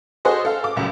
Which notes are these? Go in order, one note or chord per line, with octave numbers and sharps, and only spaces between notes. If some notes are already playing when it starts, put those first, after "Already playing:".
F#4 G#4 A4 C5 D#5
A4 F5
D6
F1 C#2 F#2